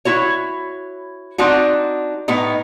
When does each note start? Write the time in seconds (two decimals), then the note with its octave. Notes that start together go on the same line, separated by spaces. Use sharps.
0.05 E4 F#4 C#5
1.38 C4 D4 D#4 F#4
2.28 A2 B3 D#4